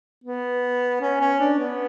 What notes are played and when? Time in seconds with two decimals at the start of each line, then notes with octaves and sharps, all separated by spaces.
0.24 B3
1.01 C#4
1.20 C#4
1.40 D4
1.59 B3